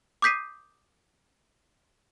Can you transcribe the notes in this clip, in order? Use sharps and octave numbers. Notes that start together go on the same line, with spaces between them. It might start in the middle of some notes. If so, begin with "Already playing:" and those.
D6 D#6 G6 B6 C7 D#7